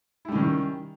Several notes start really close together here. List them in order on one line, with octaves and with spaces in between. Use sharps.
E4 G3 C#4 D#3